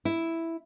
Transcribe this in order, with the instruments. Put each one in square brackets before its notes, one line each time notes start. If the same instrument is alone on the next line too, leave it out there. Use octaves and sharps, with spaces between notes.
[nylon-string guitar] E4